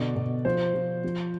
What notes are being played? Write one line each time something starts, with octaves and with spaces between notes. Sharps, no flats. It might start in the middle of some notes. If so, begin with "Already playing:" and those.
Already playing: B2 D3 D5
B2
F3 C5
F3
F3